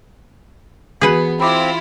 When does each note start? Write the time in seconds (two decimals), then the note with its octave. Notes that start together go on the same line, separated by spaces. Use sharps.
1.01 E3 B3 F#4 G#4 B4 F#5
1.40 C4 E4 F4 B5 D6